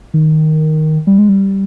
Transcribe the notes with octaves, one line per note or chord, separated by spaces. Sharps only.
D#3
G3
G#3
G3